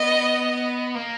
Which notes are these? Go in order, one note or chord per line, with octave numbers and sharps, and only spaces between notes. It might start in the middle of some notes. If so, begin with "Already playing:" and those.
Already playing: B3 D#5
A#3